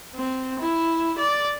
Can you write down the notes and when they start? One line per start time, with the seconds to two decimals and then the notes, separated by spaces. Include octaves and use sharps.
0.15 C4
0.59 E4
1.18 D5